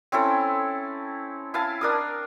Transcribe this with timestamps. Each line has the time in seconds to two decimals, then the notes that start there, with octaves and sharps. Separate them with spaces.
0.12 C4 C#4 E4 A4
1.54 E4 F5 G#5 A5
1.81 D4 A#4 D#6